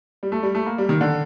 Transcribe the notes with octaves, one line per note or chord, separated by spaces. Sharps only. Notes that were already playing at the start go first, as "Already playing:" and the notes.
G3
A3
G3
A3
A#3
G3
D#3
D3